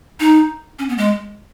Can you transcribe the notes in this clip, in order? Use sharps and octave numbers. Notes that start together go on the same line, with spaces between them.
D#4
C#4
B3
G#3